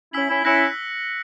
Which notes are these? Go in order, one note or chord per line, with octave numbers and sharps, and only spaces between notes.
C#4 E4 E6 B6 F#7
C#4 E4
C#4 E4 F#6 A#6 C#7 F#7